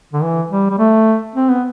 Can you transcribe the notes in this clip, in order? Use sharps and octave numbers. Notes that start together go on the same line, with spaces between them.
D3
E3
G3
G3
A3
C4
B3